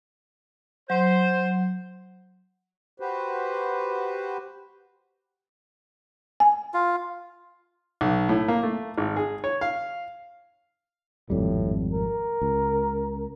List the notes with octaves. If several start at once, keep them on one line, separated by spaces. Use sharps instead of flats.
F#3 C5
F#4 G4 B4 C5
G#5
F4
B1
A2
A#3
A3
G#1
G#4
C#5
F5
G#1 F2 A2 G3
A#4
C#2